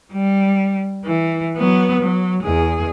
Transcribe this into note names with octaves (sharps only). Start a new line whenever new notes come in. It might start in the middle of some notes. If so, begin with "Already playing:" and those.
G3
E3
F#3 B3
F#3
E2 G#4